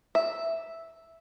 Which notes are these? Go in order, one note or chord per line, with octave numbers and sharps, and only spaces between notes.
E5